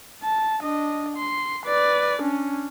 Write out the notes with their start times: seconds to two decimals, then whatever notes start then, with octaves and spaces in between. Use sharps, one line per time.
0.23 A5
0.62 D4 D#5
1.17 C6
1.66 B4 D5
2.22 C#4 D4